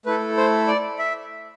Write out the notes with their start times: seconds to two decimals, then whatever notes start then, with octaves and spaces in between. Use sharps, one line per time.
0.06 A3 E4 A4 B4
0.37 C5
0.68 D5
0.99 E5